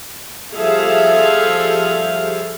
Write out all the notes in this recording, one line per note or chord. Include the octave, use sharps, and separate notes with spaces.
F3 G3 G#4 A4 E5 F5